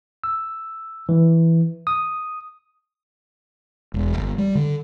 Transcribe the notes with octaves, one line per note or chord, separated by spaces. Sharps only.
E6
E3
D#6
E1
G1
G3
D3